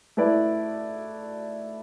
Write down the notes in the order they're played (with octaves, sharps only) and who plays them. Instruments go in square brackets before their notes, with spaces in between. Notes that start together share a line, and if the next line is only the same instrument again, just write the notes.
[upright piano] A3 E4 B4 D5